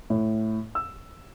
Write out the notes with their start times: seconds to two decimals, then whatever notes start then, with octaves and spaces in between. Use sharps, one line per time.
0.10 A2
0.75 E6